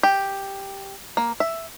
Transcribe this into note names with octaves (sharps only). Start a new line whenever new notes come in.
G4
A#3
E5